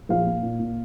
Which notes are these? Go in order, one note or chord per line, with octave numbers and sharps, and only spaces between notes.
A#1 F5
A#2
A#2
A#2